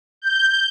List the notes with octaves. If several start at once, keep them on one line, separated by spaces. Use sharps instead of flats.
G6